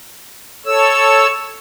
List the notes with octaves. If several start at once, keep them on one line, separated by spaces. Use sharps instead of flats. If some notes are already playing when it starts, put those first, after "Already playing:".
A4 C#5 E6